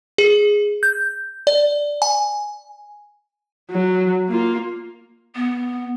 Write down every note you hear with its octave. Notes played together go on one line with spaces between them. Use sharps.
G#4
G6
D5
G#5
F#3
A#3 F4
B3